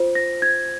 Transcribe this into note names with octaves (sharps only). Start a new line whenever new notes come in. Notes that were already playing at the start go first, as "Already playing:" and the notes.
Already playing: F4 C5
A#6
G#6